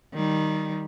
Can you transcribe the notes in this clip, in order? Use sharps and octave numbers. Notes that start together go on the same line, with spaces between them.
D#3 G3